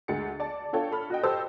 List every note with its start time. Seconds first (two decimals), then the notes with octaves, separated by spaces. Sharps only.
0.08 D2 G#3 A6 C#7
0.40 D5 A5
0.73 D4 F4 A4 C#5 G5 A5
0.92 A4 B5 F6
1.10 F#4 D#5 G5
1.23 G4 A4 C5 D#5 A5 E6